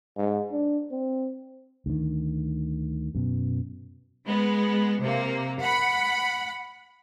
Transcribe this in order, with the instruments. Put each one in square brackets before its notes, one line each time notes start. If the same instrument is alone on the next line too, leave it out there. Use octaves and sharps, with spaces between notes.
[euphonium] G#2
D4
C4
[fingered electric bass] D2 D#3
F#2 B2
[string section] G#3 B3
C3 A#3
F#5 B5